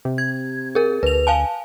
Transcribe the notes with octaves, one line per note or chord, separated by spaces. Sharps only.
C3
G#6
G#4 A#4
D2 B4 F7
F5 G#5 A5